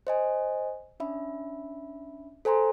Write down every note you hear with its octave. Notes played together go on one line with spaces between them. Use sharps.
C5 D#5 G#5
C#4 D4 E5 B5
A4 C5 G#5 A#5 C6